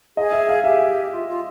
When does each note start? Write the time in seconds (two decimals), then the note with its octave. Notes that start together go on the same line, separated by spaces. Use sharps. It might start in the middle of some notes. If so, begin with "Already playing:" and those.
0.17 G#4 D#5
0.32 E5
0.49 F5
0.64 G4 E5
1.12 F4
1.27 F4